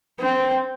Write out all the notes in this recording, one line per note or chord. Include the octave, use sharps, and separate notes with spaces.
C4